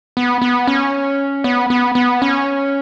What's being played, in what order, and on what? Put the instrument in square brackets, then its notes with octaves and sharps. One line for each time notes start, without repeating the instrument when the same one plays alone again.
[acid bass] B3
B3
C#4
B3
B3
B3
C#4